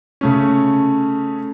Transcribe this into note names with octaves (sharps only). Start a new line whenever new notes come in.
C#3 A3 C#4